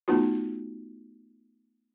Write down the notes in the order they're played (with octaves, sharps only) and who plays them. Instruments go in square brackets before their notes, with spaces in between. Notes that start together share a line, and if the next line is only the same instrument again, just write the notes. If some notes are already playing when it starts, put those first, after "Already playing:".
[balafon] A3 B3 D#4 F4 F#4